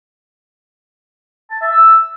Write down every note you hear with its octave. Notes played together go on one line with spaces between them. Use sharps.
A5
E5
E6